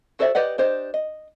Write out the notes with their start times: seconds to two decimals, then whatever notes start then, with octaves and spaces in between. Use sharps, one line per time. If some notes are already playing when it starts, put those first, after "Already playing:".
0.19 F#4 A4 C5 D5 E5
0.35 G4 B4 D5 D#5 F#5
0.58 D4 G4 C5 D#5
0.94 D#5